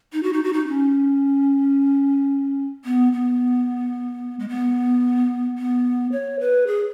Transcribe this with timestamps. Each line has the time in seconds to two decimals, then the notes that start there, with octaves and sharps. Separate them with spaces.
0.13 D#4
0.23 F#4
0.33 D#4
0.43 F#4
0.53 D#4
0.68 C#4
2.85 B3
3.13 B3
4.40 G#3
4.48 B3
5.58 B3
6.12 C#5
6.40 B4
6.67 G#4